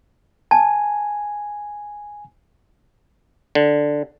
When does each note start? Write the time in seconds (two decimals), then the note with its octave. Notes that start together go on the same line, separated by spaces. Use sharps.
0.51 G#5 A5
3.55 D3